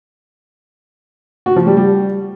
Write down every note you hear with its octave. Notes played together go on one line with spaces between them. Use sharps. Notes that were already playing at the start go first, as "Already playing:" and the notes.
F#4
F3
G3
G3